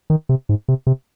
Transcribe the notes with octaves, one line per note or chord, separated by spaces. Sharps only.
D#3
C3
G#2
C3
C3